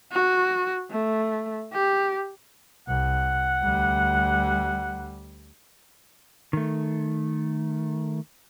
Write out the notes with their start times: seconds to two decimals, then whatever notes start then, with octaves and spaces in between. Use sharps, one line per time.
0.12 F#4
0.91 A3
1.72 G4
2.88 C2 F#5
3.64 D2 G3
6.53 D#3 A3